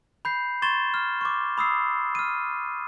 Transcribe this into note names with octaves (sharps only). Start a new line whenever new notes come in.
B5 G6 C7
C6 C#6 G#6 A6 E7 G7
F6
C#6 D6
B5 D#6 E6 C7
F6 D#7